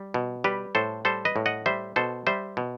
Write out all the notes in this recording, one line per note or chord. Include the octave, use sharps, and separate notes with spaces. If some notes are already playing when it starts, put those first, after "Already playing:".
Already playing: G3
B2
G3 G4 B4
A2 A4 C5
G3 A4 C5
B4 D#5
A2
D#5 F#5
G3 C5 E5
B2 A4 C5
G3 C5 E5
B2